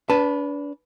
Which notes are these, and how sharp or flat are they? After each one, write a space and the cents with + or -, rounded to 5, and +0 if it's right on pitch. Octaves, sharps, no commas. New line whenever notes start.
D4 -35 B4 +0 A5 +0